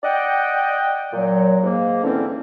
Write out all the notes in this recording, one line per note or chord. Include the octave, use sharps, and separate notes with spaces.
D5 D#5 F#5 G5
A#2 F#3
G#2 A#3
D3 E3 C4 C#4